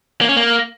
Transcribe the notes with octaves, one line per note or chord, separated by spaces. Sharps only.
A#3
C#4
A#3